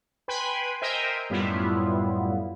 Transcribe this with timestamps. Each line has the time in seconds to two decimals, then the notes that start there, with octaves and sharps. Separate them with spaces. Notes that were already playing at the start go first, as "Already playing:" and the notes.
0.28 B4 G5 G#5 B5 C6
0.81 A#4 C5 D#5 E5 G5 G#5
1.30 F#2 A2 G3 B3 E4 F4